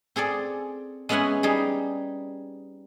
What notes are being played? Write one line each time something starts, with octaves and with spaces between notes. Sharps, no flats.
C4 G#4 A4 D5
G#3 B3 C#4 E5 F#5 G#5
G3 D#4 G#4